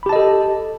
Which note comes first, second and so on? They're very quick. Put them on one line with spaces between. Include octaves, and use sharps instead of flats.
B5 G4 A5 D#5 A4